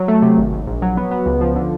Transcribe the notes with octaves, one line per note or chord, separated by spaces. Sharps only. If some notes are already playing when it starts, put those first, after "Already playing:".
Already playing: F#3
A3
C3
G#1
G#1
A#1
F#3
B3
B3
C#2
F3
D3